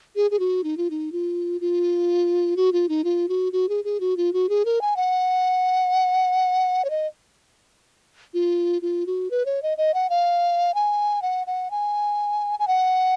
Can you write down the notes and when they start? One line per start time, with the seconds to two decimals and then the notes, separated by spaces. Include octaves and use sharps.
0.16 G#4
0.31 G#4
0.39 F#4
0.64 D#4
0.77 F4
0.90 D#4
1.12 F4
1.61 F4
2.57 F#4
2.73 F4
2.89 D#4
3.04 F4
3.29 F#4
3.53 F#4
3.69 G#4
3.84 G#4
4.00 F#4
4.17 F4
4.33 F#4
4.49 G#4
4.65 A#4
4.81 G#5
4.96 F#5
6.85 C#5
6.90 D#5
8.34 F4
8.82 F4
9.07 F#4
9.31 B4
9.46 C#5
9.63 D#5
9.78 D#5
9.94 F#5
10.10 F5
10.74 G#5
11.22 F#5
11.47 F#5
11.71 G#5
12.59 G#5
12.68 F#5